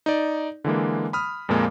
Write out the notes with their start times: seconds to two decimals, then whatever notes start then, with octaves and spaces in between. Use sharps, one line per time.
0.06 D#4 D5
0.64 D3 E3 G#3 A#3
1.13 B5 D#6 F6
1.49 F2 A#2 F3 G#3 A#3